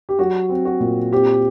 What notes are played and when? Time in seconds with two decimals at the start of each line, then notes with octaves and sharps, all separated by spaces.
0.09 G4
0.19 F#3 F#4
0.49 C4
0.65 F#4
0.80 A#2
1.12 C4 G4